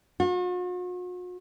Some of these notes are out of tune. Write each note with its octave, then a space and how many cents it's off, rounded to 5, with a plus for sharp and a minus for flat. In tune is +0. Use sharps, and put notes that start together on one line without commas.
F#4 -45